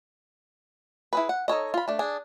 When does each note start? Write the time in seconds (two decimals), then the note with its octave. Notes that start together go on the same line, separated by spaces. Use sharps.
1.13 E4 G#4 B4
1.29 F#5
1.48 D#4 A4 C#5 D#5
1.74 F4 B5
1.88 A3 D4
1.99 D4 G#4